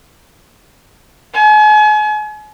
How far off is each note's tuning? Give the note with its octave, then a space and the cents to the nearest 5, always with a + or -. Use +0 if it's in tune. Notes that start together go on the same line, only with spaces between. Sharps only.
G#5 +40